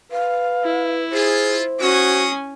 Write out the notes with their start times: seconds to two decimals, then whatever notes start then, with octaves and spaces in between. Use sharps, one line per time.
0.12 B4 F5
0.64 E4
1.13 F4 G#4 C5
1.80 G#3 C#4 F#4 G#5 C#6 D#6